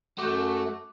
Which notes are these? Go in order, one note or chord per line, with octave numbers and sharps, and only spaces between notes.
F#2 A3 F#4 D6 G6